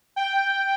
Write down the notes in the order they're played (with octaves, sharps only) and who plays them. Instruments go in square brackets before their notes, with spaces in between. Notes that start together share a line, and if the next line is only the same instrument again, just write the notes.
[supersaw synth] G5